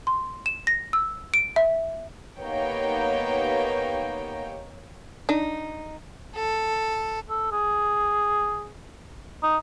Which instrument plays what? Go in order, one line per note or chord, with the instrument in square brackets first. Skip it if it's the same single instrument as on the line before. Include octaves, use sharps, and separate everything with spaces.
[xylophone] C6
E7
A#6
E6
D7
E5
[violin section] A#3 B3 D#4 G4 C#5 G5
[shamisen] D4 [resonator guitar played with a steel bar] D#4
[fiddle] A4
[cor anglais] A4
G#4
D#4